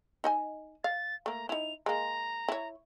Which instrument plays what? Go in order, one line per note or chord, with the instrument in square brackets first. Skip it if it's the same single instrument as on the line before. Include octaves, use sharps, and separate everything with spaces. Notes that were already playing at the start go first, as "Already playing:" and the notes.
[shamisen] D#4 D#5 G#5
[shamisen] F5 [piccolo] A6
[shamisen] A3 A#3 [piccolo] A#5
[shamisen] D#4 E4 [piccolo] F7
[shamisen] G#3 A#3 [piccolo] A#5
[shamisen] E4 C#5